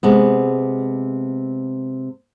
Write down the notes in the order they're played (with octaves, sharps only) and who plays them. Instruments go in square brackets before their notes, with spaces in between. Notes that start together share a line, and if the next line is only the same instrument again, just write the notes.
[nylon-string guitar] C3 G#3 B3